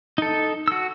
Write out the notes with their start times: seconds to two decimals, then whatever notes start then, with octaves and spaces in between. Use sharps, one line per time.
0.18 D#4 A4
0.68 F#4 E6